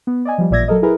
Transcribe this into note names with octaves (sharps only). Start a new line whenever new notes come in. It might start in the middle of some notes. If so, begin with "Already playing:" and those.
B3
D5 D#5 G#5
F3 G3
A1 A#2 D5 E5 G#6 A#6
F#3 A4 A#4 D#5
E4 G#4 A#4 B4